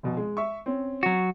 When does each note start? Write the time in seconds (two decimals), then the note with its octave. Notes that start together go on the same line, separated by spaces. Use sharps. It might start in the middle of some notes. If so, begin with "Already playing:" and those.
0.03 F1 B2
0.17 G#3
0.37 E5 C#6
0.66 C4 C#4
1.03 F#3 F#4